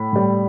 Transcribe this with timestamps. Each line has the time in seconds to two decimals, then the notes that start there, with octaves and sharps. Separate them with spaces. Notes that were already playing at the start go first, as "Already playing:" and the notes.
Already playing: A2 B5
0.13 A2 G3